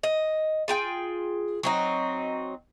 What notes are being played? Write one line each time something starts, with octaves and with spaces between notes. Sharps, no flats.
D#5
F4 G#4 G5
F#3 C4 D#4